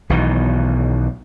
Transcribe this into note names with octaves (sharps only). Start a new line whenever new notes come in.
B1 B2 D#3 E3